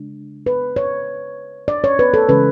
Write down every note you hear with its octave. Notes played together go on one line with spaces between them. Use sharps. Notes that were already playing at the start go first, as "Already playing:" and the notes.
Already playing: C#3 G#3 D4
B4
C#5
D5
C#5
B4
A4
C#3 E3 G#3 C#4 B4